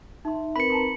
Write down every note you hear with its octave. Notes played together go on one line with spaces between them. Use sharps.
D#4 E5 C6
C4 A#4 B4 B5 C#7
A5 A#5 C6